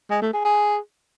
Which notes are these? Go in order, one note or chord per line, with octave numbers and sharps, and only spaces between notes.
G#3
A3
G#4
G#4